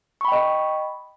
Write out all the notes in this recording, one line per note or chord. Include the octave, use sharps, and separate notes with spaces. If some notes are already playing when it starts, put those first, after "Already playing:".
D#5 G5 B5 C#6